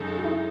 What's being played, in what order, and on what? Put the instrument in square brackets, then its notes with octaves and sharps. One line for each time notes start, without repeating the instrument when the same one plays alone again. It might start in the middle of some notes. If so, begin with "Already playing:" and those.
Already playing: [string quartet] F#2 C#3 G#3 D#4 A4
[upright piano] F#4
E4